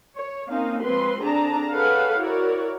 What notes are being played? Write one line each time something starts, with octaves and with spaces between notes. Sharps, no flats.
C#5
A#3 C4 C#4 D#4 F5
F3 G#3 C4 B4 C6
D3 C4 D4 G#4 A5 A#5
G#4 A4 B4 C#5 F5 F#5
E4 F#4 A#4 C#5 D5